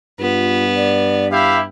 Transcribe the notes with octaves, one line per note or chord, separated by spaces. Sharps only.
G2 B3 F4
D5
E4 G4 E5 F5